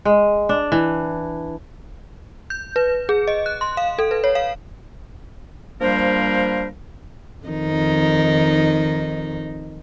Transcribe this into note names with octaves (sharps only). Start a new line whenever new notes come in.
G#3
D4
E3
G6
B4
G#4
D#5
F#6
C6
F5
A4
B4
C#5
F5
F3 G3 A#3 D4 A#4 C5
F2 D#3 D#4